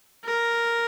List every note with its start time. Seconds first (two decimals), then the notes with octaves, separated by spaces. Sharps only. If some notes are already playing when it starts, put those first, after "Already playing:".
0.25 A#4